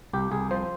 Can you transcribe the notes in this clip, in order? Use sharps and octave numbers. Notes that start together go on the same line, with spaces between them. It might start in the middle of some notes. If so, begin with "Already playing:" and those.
C2 G4
C2 G#4
F3 C5